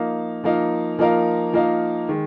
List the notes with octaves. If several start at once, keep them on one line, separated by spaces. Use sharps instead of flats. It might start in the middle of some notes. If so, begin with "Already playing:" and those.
Already playing: F3 A#3 D#4 A#4 F5
F3 A#3 D#4 A#4 F5
F3 A#3 D#4 A#4 F5
F3 A#3 D#4 A#4 F5
D#3 G#3